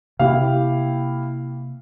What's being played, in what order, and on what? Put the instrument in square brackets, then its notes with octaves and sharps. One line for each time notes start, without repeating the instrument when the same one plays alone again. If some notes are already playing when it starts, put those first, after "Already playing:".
[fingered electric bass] C3 A#3 [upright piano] E4 G4 F5